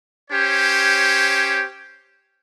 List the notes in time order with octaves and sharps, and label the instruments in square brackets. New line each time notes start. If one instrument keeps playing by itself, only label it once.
[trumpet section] C#4 G4 C5 C#5